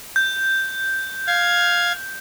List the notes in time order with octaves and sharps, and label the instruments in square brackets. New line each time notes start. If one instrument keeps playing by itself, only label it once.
[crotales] G6
[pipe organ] F5 G#6